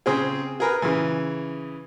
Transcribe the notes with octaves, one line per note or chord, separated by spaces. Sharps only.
C#3 C4 G#4
G#4 A#4 B4
C#3 E3